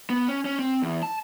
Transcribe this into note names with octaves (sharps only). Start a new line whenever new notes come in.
B3
C#4
C#4
C4
E2
A5